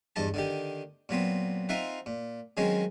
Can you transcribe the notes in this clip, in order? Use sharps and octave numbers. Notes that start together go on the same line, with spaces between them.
E2 G2 D#5 A5
D3 D#3 G4
A#2 F#3 B3 C4
C4 D#4 F4 E5 F#5
A#2
D#3 F#3 G#3 C4 C#4